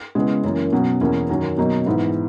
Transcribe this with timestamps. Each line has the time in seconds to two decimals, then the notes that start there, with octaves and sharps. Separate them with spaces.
0.15 C#3 G#3 B3 E4
0.44 F#2 E3 A#3
0.72 B2 F#3 C#4
1.01 E2 B2 A#3 C#4 E4
1.29 F#2 D#3 F#3 C#4
1.58 B2 F#3 A#3 D#4
1.86 G#2 E3 B3 E4